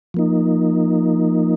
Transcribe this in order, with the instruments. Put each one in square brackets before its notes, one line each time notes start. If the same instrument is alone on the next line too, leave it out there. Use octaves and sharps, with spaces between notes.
[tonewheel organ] F3 A#3 D#4